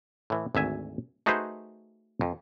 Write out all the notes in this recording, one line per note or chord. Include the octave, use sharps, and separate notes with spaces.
A2 E3
G#1 D2 E5 G#5
A3 D#4 F#4 G#4 B4 C5
F2